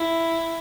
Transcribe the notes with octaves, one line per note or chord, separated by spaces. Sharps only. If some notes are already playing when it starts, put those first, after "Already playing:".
Already playing: E4